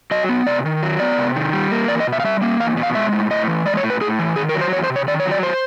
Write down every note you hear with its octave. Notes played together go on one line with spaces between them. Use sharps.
F#3 D#5
B3
C3 D5
D#3
F#3
B3 D5
C3
D#3
G3
A#3
E2 D5
D#5
B2
E5
F5
G3 E5
A#3
E2 F5
B2
F5
G#3 E5
A2
A2 D#5
E3
G#3 D5
C#5
A2
B4
A2 G#4
E3
D#3 G#4
A#4
F#3
C5
E2 C#5
C5
C3
C#5
D#3 D5
C#5
F#3
D5
C5